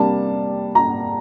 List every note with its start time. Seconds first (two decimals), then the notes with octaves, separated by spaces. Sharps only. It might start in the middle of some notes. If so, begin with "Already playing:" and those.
Already playing: C3 G3 A#3 D4 A5
0.75 A#5